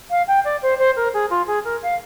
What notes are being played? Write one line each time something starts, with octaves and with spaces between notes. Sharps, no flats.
F5
G5
D5
C5
C5
A#4
G#4
F4
G#4
A#4
F5